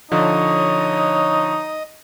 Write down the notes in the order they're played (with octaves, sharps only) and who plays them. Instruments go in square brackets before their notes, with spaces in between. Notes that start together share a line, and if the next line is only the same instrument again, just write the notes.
[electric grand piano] D3 F3 [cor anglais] D#4 [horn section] C#5 [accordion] D#5